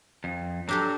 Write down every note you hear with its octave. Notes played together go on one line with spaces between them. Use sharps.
F2
F#3 D4 G4 A4